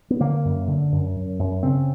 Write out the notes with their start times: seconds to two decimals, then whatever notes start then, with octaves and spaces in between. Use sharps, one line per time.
0.10 B3
0.20 D3 A#3
0.45 F#2
0.68 D3
0.92 F#2
1.16 F#2
1.39 F#2
1.63 C#3 C4